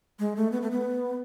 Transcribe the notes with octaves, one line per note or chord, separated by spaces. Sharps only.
G#3
A3
B3
A3
B3